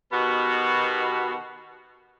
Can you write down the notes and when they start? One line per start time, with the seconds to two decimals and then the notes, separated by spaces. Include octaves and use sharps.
0.12 B2 D#3 B3 F#4 G4